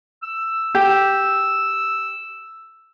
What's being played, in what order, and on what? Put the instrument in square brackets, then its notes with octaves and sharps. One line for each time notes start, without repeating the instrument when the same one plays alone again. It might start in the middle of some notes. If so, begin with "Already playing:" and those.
[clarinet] E6
[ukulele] G4